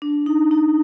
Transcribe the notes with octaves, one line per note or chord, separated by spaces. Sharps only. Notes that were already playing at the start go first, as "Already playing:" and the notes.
D4
D#4
D#4